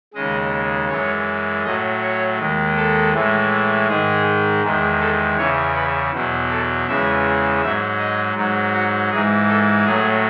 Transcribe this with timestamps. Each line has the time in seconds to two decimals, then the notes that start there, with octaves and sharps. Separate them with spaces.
0.14 D#2 C#3 G#3 D#5
0.89 F#2 E3 G#3 C#5
1.64 A2 F#3 D#5
2.01 C#5
2.38 D#2 D#3 G#3
2.76 A4
3.13 A2 E3 G#3
3.88 G#2 D#3 G#3 G#4
4.63 E2 D#3 G#3
5.00 A4
5.37 E2 C#3 E3 C#5
5.75 B4
6.12 E2 B2 F#3
6.50 A4
6.87 E2 C#3 E3 G#3 E5
7.61 G#2 F#3 E5
7.98 D#5
8.36 G#2 F#3
8.73 F#4
9.10 G#2 E3 G#3 G#4
9.48 A4
9.85 A2 F#3 G#4